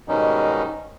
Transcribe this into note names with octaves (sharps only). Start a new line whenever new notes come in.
G#2 B2 D#3 G3 C#4 D#4